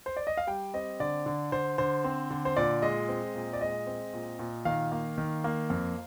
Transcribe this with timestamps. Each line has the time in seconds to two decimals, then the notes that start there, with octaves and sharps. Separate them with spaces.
0.06 C5
0.17 D5
0.27 D#5
0.37 F5
0.47 G3 G5
0.74 C4 D#5
1.00 D3 D5
1.26 D3
1.52 D3 C5
1.78 D3 C5
2.04 C4
2.30 D3
2.45 C5
2.57 A#2 D5
2.82 G#3 D#5
3.09 C4
3.35 A#2
3.53 D5
3.61 G#3 D#5
3.87 C4
4.13 A#2
4.39 A#2
4.65 D#3 F5
4.92 A#3
5.18 D#3
5.44 A#3
5.70 F2